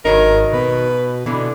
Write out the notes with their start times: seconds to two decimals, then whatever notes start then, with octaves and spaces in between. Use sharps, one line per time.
0.05 G#1 D#3 F#3 D#4 A#4
0.53 B2 B4
1.26 B2 D3 E3